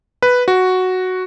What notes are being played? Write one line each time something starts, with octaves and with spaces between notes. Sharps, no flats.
B4
F#4